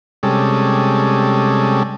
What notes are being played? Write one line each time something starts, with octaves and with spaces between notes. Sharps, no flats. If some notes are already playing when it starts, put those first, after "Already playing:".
C3 G3 G#3 C#4 A4